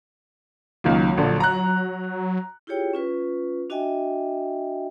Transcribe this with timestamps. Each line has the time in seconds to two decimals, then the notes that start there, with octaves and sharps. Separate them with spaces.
0.84 C#2 D#3 F#3 A#3
1.18 A#1 D3
1.40 A#5 F#6
2.67 E4 F4 G4 G#4 C#5 G5
2.93 C#4 F4 B4
3.70 D4 F#4 D#5 E5 G5 G#5